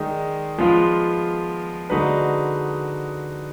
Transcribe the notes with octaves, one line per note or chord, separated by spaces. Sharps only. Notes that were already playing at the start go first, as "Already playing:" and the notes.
Already playing: D#3 G#3 D#4 G#4 D5
F3 G#3 B3 F4
D3 G#3 D#4 F#4 B4